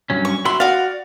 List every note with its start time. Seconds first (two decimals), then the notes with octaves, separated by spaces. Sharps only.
0.10 G2 F#3 C#4
0.25 C#6
0.45 F#4 E5 B5 C6
0.60 F#4 D5 F5